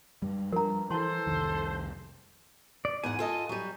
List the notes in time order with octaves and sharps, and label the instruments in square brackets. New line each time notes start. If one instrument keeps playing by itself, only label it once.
[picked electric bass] F#2 G3
[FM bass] F3 [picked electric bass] G3 D4 [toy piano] A#4 A#5
[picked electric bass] E3 [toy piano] E4 A5 C6 [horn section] A4 C5
[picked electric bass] C2 F2 [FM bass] D#3
[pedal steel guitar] D5
[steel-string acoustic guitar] E2 G#2 F#5 [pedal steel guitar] G#5
[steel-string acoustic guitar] F4 A4 D#5
F#3 G3